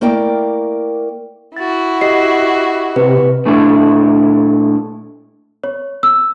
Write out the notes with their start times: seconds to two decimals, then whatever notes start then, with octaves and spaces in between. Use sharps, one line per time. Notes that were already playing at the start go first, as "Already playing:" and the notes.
0.01 A3 A#3 E4 A#4 D5 G5
1.56 E4 F#4 A6
2.01 G4 D#5 C7
2.96 C3 B4
3.45 A#2 A3 D4 E4
5.64 C#5
6.03 E6